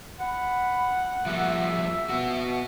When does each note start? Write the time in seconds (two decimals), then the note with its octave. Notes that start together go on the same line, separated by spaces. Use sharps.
0.20 F#5 B5
1.26 F3 G3 A#3 E5
2.09 B3 F#4